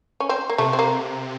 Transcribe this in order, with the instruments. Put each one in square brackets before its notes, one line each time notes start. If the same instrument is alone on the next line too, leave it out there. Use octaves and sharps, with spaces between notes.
[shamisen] C#4
C4
A#3
[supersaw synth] C3 [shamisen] A3
[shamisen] C4
A#3